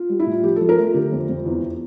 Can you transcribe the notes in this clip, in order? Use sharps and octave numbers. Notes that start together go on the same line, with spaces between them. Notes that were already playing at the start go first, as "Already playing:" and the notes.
Already playing: F4
G3
E4
A2
F4
F3 G4
A4
F3
A#4
A3 F4
D3 G4
F2
F2
E2